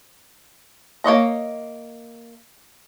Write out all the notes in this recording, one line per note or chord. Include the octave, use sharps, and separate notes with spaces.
A#3 C#5 D#5 A#5